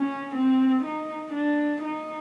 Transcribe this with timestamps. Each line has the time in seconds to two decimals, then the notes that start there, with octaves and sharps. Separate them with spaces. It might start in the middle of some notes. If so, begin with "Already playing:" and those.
Already playing: C#4
0.35 C4
0.84 D#4
1.34 D4
1.83 D#4